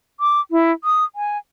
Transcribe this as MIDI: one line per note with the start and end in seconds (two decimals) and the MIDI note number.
0.20 0.40 86
0.51 0.71 64
0.84 1.04 87
1.15 1.38 80